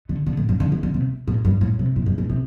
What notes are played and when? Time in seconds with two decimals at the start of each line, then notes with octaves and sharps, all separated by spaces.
0.09 D3
0.26 D3
0.37 A2
0.49 G2
0.60 D3
0.72 E3
0.83 D3
0.94 C3
1.28 A2
1.45 G2
1.61 A2
1.79 C3
1.96 A2
2.06 G2
2.18 A2
2.30 C3